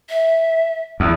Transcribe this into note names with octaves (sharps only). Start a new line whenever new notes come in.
E5
E2